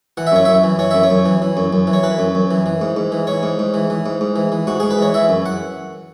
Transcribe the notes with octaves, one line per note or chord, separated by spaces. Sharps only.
E3 F#5
E5
F#2 C#5
F#2 E5
E3
E3 C#5
F#2 E5
C#5
F#2
E3
E3
F#2
F#2
E3
C#5
E3 B4
F#2
F#2
E3
E3
G#2
G#2
E3
E3 C#5
G#2
G#2
E3
E3
G#2
G#2
E3
E3
G#2 F#4
G#2 G#4
B4
E3 C#5
E3 E5
F#2
F#5